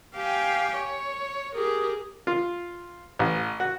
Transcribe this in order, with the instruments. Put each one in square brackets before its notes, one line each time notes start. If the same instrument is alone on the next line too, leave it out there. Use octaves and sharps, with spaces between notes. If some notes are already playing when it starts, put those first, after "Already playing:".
[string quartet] G4 F5 G5 G#5
C#5
G4 G#4 A#4
[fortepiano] F4
A1
F#4